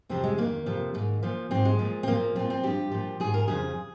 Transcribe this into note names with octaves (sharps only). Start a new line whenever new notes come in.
F2 C3 F3 C4
G#3
F2 D#3 A#3
F2 C3 F3
G#2 D#3
A#2 F3
G#2 F3 C4
G#3
A#2 F3
C4
A#2 F3 A#3
A#2 F3 C4
C4
G2 F3 G4
A#2 F3
G#2 F3 G#4
A#4
F2 C#3 F3 G#4